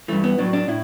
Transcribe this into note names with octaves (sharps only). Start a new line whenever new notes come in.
G2 E3 A3
B3
A2 F#3 D4
D4
A2 E4